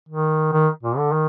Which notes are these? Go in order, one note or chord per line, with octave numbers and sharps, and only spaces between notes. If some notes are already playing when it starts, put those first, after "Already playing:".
D#3
D#3
A#2
D3
D#3